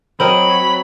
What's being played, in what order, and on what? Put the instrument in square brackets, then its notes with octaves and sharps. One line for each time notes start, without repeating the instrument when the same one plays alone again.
[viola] F#3 [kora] C4 A#4 D#5 [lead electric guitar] B5